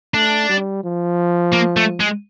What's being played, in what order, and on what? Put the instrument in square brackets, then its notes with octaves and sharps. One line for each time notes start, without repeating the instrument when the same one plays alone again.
[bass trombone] A3 [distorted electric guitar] D4
[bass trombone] G3
F3
[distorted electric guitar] A#3
A3
G#3